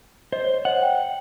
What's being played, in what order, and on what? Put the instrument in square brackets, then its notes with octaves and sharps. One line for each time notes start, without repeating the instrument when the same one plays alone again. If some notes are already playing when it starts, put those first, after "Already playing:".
[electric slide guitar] C5 [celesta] D#5
[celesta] C#5
[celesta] C5 D#5 [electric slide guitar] F#5
[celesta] G5